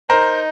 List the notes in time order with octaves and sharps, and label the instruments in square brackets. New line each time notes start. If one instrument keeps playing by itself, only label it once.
[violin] D#4 [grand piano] A#4 C5